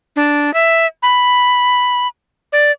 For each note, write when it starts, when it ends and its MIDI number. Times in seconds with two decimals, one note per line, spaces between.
0.16 0.53 62
0.54 0.86 76
1.03 2.08 83
2.53 2.72 74